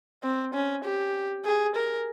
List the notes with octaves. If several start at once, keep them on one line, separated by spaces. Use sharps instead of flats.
C4
C#4
G4
G#4
A#4